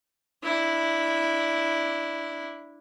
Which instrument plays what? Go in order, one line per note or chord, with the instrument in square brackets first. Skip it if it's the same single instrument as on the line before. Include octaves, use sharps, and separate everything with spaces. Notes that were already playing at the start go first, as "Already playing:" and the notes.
[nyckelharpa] D4 E4